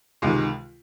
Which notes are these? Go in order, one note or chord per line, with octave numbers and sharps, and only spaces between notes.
C#2 C3 D#3 G#3